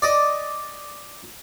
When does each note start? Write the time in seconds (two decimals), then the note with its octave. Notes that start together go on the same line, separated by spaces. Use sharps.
0.02 D5 D#5